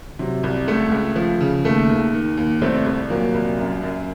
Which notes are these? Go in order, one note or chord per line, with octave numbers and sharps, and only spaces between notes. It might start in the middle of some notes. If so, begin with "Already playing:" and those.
C3 F#3
C2
C#2 A3
C#2
F3
C#3
D#2 A3
D#2
D#3
D#2
C2 A3 C4
C2
A#2 F#3 A#3
C2
F#2
F#2